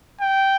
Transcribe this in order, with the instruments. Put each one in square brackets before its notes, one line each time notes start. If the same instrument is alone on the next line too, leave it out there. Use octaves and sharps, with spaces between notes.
[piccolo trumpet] G5